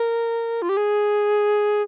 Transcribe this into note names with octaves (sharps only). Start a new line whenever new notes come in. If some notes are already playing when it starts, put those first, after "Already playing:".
Already playing: A#4
F4
G4
G#4